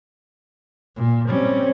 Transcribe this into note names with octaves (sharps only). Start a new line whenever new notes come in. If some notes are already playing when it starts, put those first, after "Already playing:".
A#2
G3 C4 C#4